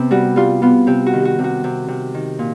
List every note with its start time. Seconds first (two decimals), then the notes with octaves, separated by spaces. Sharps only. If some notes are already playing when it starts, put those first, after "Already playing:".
Already playing: C3 B3
0.11 G3 F#4
0.36 G3 F4
0.62 B3 F4
0.87 C3 G4
1.06 F#4
1.13 D#3
1.25 F#4
1.39 C3
1.44 F#4
1.64 C3
1.88 C3
2.14 D#3
2.39 A#2